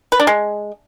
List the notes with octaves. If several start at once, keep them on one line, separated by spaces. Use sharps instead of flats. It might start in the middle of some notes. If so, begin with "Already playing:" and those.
B4
D4
G#3